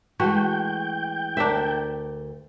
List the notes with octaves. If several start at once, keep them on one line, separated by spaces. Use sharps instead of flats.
E3 G#3 A3 F#4 G5
D2 D4 A#4 E5